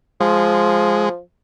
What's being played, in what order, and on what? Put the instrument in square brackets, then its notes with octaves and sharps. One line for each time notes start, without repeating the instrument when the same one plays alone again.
[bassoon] F3 [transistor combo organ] G#3